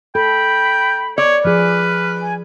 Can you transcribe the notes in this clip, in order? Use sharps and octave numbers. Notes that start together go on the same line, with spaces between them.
A4 G5 B5
C#5 D5
F3 G#4 B4 F6
G#5